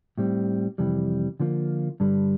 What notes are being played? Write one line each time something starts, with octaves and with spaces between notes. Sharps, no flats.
A2 G3 C4
F2 C3 E3 G3
D3 F3 A#3 F4
G2 D3 G3